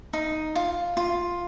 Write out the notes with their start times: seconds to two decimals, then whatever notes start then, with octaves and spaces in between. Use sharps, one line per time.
0.13 D#4
0.55 F4
0.97 F4